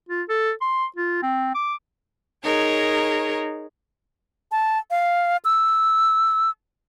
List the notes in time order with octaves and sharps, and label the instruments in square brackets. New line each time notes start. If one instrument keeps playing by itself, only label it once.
[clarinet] F4
A4
C6
F4
C4
D6
[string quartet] D#4 G#4 A#4 C#5
[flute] A5
F5
E6